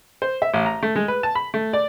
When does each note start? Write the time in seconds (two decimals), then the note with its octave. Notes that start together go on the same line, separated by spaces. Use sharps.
0.22 C5
0.42 E5
0.54 A1
0.66 A#5
0.83 A3
0.96 G#3
1.08 B4
1.23 A5
1.35 B5
1.54 A3
1.73 D5